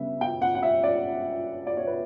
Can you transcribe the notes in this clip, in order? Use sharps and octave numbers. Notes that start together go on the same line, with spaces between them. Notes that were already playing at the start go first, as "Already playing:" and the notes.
Already playing: C#3 G3 B3 D4 E5
G5
F#5
F#5
E5
D5
D5
C#5
B4